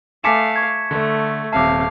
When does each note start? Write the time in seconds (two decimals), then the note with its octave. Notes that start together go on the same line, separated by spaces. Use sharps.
0.24 A3 F5 G#5 A5 D6 B6 C#7 E7
0.56 C#6 G#6
0.91 D3 A3
1.53 D#1 C3 E5 F5 A5 D6